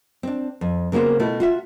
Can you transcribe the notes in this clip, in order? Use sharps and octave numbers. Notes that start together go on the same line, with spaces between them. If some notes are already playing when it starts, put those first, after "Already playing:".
C4 D4
F2
C#3 A#3 B3 F#4 C5
B2 A3 E4
F4 F#4 E5